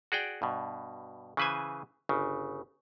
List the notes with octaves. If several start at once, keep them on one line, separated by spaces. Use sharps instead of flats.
F#4 G#4 D5 G5
G2 B2
C#3 E3 B4 C5 G#5
G1 C#3